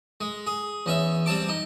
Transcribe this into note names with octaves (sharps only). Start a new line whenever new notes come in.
G#3
G#4
E2 C#4 E5
G3 C4 A5 D6
D#4